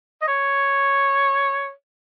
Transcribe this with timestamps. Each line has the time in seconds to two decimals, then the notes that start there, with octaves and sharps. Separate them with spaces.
0.22 D#5
0.28 C#5